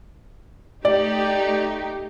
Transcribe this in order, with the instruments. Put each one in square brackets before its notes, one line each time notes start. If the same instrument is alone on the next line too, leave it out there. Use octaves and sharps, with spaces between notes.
[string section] A3 D#4 G4 [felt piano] D5